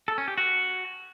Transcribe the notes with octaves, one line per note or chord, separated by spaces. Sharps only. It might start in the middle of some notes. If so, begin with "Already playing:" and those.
A4
C#4
G4
F#4